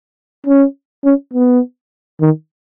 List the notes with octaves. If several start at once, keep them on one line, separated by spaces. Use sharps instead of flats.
C#4
C#4
B3
D#3